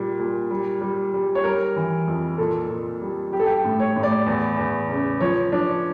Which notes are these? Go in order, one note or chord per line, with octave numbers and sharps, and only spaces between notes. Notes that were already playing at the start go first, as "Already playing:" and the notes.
Already playing: A#2 G3
A#2
G3
G3
G3
C#5
G3 A#4
E3
F2
A#2 A4
A#2
G3
G3 G4
A4
G4
A2
C#5
A2
D5
E2
E2
C#3
F3 C#5
F3 D4